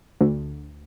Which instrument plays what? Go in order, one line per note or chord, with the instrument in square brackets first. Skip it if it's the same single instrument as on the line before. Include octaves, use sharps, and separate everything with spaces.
[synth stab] D2